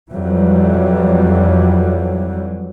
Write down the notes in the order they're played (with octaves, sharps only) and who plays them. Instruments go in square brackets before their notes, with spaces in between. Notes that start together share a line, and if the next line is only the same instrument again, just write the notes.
[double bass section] F2 E3 F#3 G3